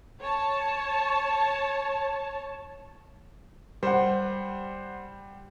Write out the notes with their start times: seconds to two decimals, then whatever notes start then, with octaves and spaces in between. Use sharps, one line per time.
0.21 C#5 A5
3.83 G3 C5 F#5